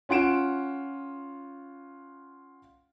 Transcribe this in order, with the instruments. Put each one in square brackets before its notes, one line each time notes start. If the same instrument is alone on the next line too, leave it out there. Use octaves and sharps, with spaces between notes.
[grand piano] C#4 F4 F#5 D7 E7